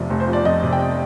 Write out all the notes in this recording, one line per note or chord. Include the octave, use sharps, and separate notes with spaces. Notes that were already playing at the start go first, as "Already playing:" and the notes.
Already playing: F1 F2 C3 F3 D5
F1
C5
F3 D5
F2 D#5
C3
G5